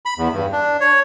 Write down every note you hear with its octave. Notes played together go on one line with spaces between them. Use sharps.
B5
E2
G2
D4
C#5